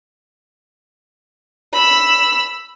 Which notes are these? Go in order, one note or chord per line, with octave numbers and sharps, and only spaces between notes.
B5 E6